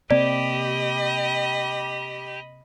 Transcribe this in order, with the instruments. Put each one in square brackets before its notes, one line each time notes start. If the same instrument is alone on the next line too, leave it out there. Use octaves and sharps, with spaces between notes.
[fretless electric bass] C3 A#3 C4 [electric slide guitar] G4 [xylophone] D5 [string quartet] D#5 B5